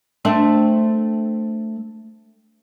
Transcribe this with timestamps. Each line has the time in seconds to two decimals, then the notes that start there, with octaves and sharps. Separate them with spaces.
0.25 A3 C4 D4